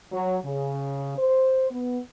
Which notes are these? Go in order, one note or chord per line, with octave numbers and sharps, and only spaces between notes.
F#3
C#3
C5
B3